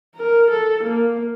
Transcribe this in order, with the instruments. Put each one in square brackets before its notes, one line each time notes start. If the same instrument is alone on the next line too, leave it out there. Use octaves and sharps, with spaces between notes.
[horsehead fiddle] A#4
A4
A#3